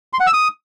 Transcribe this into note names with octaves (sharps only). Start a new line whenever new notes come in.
C6
F#5
E6
D#6